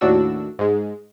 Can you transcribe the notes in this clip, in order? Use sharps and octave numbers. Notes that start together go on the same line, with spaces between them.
D#2 A2 D4 F#4 E6
G#2 G#3